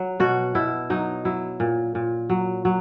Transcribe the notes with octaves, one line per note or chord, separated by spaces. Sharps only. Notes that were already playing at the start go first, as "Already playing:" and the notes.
Already playing: F#3
B2 F#4
B2 E4
F#3 D#4
F#3 E4
A#2
A#2
F#3
F#3